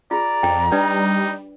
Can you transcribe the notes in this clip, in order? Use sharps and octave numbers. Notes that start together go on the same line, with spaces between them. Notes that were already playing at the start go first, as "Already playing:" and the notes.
F4 G#4 D5 A#5
F2 G5
G3 D4 D#4 B4 D5